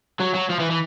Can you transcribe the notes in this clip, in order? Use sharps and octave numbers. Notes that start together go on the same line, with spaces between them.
F#3
F#3
F3
E3
E3